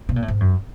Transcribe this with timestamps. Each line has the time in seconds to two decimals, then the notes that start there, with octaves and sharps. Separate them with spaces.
0.09 B2
0.16 A#2
0.22 A2
0.28 G#2
0.40 F#2